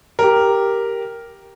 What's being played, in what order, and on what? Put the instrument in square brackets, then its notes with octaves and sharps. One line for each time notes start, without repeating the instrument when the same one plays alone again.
[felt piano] G4 A#4